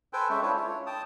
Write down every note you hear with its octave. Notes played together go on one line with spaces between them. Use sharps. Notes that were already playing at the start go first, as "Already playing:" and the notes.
A4 B4 C5 G5 G#5
G#3 C#4 E5
D4 E4 F4 A4 C#5
C#5
G5 A5 D#6